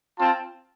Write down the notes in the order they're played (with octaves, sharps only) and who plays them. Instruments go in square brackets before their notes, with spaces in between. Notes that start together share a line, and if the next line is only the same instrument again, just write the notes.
[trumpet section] C4 F4 A5